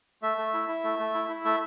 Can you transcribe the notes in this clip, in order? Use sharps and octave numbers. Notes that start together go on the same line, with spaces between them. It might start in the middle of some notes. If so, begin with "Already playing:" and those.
A3 E5
A3
E4
E4
A3
A3
E4
E4
A3 E5